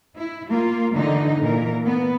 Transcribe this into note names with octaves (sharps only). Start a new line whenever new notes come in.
E4
A#3 F4
D3 E3 D#4
A#2 E3 A#4
B3